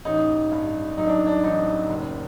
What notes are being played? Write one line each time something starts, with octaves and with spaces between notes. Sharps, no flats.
A1 D#4
G2
F#3 D#4
D4
D4
A1 D#4
F#1